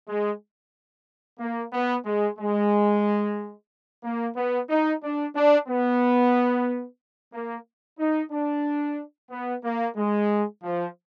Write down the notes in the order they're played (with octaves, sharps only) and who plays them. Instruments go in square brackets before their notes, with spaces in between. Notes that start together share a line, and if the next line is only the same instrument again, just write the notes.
[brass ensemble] G#3
A#3
B3
G#3
G#3
A#3
B3
D#4
D4
D4
B3
A#3
D#4
D4
B3
A#3
G#3
F3